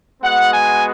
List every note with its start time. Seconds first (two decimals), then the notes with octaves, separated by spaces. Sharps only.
0.23 G#3 B3 F#4 F#5
0.53 G#5